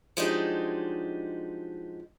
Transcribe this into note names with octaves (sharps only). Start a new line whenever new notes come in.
F3 F#3 G#3 D4 D#4 G4